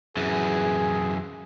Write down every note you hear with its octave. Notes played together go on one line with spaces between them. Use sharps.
F#2 E3 G#4